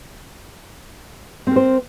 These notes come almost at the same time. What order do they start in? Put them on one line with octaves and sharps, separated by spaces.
C4 A#4 C5